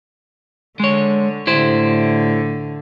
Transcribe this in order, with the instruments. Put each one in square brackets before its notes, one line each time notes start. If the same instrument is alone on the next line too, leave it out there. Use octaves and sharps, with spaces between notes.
[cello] D3 [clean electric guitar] G#3 C#5
[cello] A2 D3 [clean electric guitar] E4 G4 C5